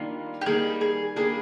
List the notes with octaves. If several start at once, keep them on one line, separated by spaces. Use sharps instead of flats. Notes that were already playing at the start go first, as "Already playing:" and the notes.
Already playing: D#3 G3 A#3 D4 F4
G4
D#3 G3 A#3 G#4
G#4
G3 A#3 D4 G#4